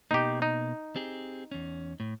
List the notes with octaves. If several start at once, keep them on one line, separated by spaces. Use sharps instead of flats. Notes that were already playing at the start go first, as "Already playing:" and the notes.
B2 A#3 D#4 G4
D#4
C4 G4 G#4
E2 C#4
A2